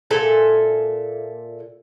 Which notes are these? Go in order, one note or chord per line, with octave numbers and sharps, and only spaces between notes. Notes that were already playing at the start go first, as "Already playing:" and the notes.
A#2 A4 E5 G#5